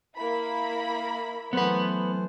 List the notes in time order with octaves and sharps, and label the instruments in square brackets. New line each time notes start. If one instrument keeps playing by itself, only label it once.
[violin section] A#3 E4 B5
[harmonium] E3 A3 C5 [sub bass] F#3 [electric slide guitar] B3 B4